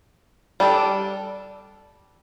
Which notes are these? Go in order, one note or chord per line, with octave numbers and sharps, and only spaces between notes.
G3 D4 A4